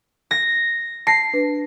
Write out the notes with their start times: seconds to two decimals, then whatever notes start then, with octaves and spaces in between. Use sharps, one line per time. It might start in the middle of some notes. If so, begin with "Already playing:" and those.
0.31 A#6
1.07 A5 A#6 C7
1.34 D4 B4